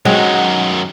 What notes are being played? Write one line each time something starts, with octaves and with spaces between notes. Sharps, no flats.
F#2 D#3 F#3 G#3